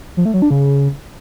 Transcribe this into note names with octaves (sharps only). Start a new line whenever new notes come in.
F3
A3
F#3
D4
C#3